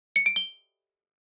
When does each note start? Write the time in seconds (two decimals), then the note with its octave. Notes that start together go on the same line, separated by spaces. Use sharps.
0.16 C#7
0.26 D7
0.36 G7